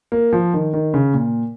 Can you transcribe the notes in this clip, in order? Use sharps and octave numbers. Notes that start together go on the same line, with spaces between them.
A#3
F3
D#3
D#3
C#3
A#2